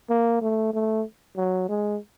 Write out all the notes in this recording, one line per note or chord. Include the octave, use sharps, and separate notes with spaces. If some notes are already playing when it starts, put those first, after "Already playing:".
A#3
A3
A3
F#3
G#3